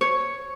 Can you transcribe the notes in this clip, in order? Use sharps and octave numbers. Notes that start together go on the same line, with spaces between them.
C#5